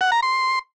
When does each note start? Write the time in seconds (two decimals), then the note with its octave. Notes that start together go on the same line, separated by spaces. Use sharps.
0.01 F#5
0.12 A#5
0.23 C6